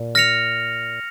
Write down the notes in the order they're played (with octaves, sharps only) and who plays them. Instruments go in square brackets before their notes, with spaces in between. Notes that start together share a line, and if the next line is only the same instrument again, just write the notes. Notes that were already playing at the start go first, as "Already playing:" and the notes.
Already playing: [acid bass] A#2
[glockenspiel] F6 A#6 C#7 F7